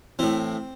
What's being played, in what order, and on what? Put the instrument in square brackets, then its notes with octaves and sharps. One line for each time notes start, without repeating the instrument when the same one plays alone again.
[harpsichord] A2 E3 C4